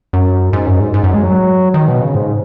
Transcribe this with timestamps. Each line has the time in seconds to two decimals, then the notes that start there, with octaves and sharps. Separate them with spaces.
0.13 F#2
0.53 G#2
0.67 F#2
0.80 G#2
0.94 G#2
1.04 F#2
1.14 G#3
1.23 F#3
1.74 D#3
1.88 B2
2.01 C#3
2.15 G#2